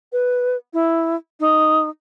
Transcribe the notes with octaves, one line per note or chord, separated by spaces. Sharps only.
B4
E4
D#4